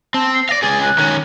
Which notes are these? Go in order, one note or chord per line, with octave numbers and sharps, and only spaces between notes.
C4 A5
C7
D5 F5 A#6
C#2 G#4 A6
F#6
D#3 C#4